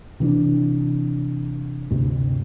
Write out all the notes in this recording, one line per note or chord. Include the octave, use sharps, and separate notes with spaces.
C3 E3 C4 D4
D2 G2 C3